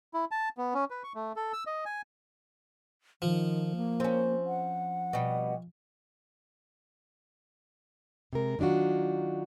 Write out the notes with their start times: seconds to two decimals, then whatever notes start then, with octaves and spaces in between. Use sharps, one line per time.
0.14 E4
0.31 A5
0.58 B3
0.74 C#4
0.90 B4
1.04 C#6
1.15 A3
1.36 A4
1.53 E6
1.67 D#5
1.85 G#5
3.22 D#3 F3
3.76 A#3
4.00 C4 C#4
4.46 F#5
5.13 B2 G3
8.33 C3 G#3 A#4
8.59 D#3 F#3 D4 F4 F#4